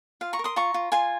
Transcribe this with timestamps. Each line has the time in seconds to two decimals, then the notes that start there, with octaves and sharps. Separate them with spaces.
0.21 F4 F5
0.33 A#5 C#6
0.39 A#4
0.44 C6 D#6
0.56 F4 A#5 C#6
0.74 F4
0.92 F4 G#5 C6